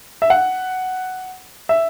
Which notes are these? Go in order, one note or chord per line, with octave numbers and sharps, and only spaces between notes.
E5
F#5
E5